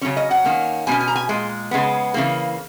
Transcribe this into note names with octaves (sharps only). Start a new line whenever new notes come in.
C#3 F#3 C#4 C#5
D#5
F#5
D#3 A#3 C#4
B2 A#3 C#4 G#5
G#5
A#5
G#5
A#2 G#3
C#3 G#3 B3
C#3 E3 A#3